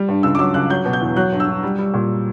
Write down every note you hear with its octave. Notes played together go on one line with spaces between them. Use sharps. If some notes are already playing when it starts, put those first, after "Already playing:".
Already playing: G3
G2
C#2 E6
D6
F#3 E6
C#2 F#6
F#3 G6
B2
G6
E2
F#3 F#6
G2
E6
G2
G3
G3
A#2